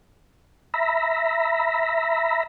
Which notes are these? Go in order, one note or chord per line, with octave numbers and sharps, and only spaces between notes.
E5 A#5 B5